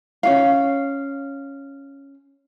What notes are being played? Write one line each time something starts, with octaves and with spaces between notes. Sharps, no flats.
C#4 F#4 F5